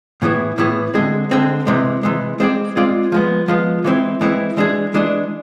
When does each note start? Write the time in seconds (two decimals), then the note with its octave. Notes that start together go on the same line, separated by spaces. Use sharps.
0.22 A2 E3 B3 E4 G#4
0.58 A2 E3 B3 E4 G#4
0.94 D3 G#3 C4 G#4
1.31 D3 G#3 C4 G#4
1.67 C3 E3 G#3
2.03 C3 E3 G#3
2.40 G#3 C4 F4 G#4 D5
2.76 G#3 C4 F4 G#4 D5
3.12 F3 G#3 B3
3.48 F3 G#3 B3
3.85 E3 G#3 C4 E4
4.21 E3 G#3 C4 E4
4.57 E3 G#3 D4 G#4
4.94 E3 G#3 D4 G#4